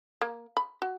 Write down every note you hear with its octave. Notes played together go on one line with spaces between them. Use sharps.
A#3
B5
F#4